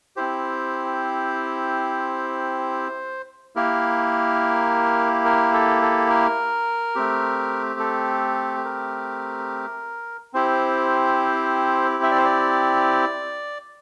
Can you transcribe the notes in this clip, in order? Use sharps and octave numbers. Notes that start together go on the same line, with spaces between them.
C4 E4 G4 C5
A#3 E4 G4 A#4
A#4
A4
A4
A#4
A3 C4 G4
A4
A#4
C4 E4 G4 C5
E5
D5
C5
D5